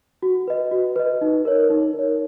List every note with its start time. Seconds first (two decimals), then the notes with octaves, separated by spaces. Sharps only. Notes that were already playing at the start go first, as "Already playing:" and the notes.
0.23 F#4
0.48 B4 D#5
0.71 F#4
0.96 B4 D#5
1.21 D#4
1.45 A#4 C#5
1.70 D#4
1.93 A#4
1.99 C#5